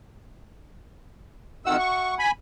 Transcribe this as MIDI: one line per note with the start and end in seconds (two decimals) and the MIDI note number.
1.66 1.76 41
1.66 1.76 51
1.66 2.23 66
1.66 2.23 76
1.66 2.23 78
1.66 1.76 88
1.79 2.14 85
2.19 2.31 80
2.19 2.31 83